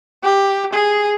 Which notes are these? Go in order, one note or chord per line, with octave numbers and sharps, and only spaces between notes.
G4
G#4